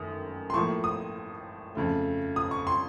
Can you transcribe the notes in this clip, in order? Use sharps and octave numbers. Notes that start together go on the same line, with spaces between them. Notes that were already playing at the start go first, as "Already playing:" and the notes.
Already playing: F#2 D#3 A3 D#6
C6
A2 F3 A#3 C#6
D#6
F2 C#3 A3
D#6
C#6
C6